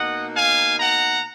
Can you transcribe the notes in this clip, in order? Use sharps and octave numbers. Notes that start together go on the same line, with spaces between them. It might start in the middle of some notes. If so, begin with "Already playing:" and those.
Already playing: B2 A#3 D#4 D#5 F#5
F5 G#5
F#5 A#5